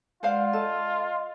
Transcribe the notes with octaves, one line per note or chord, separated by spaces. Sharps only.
G#3 F4 B4 C5 D5 F5 F#5
A4 D#5